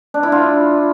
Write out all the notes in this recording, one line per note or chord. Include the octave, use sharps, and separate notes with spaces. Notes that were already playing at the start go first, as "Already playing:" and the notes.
D4
E4
F4